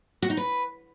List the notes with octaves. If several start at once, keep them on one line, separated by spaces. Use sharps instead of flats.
F#4
D#4
B4